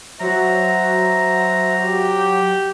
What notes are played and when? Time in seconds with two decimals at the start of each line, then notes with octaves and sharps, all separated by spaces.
0.20 F#3 F#4 C5 E5 A#5
1.78 G4